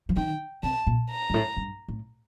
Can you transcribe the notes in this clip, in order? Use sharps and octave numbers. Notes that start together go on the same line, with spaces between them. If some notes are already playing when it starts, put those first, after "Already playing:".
F3
D#3 G5
C3 A5
A#2
A#5
G2
A2
G2
A2